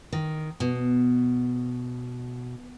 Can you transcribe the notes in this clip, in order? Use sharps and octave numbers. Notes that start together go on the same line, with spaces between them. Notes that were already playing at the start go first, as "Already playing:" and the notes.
D#3
B2